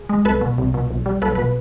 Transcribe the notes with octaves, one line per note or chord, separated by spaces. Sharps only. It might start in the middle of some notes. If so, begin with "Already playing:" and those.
Already playing: G#4
G#3
C2 A4 B4
B2
C2
B2
B1
G3
B1 A4 B4
B2 B4